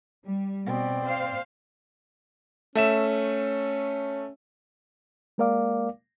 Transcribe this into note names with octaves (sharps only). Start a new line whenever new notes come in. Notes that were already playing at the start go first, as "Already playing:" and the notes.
G3
B2 B3 C4 D5
C5 F5
A3 C#4 E5 E7
G#3 A#3 A#4 D5 F5 D6